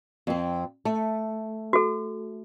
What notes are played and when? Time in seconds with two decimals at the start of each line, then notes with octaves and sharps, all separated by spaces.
0.27 F2 C4
0.85 A3
1.73 F#4 A4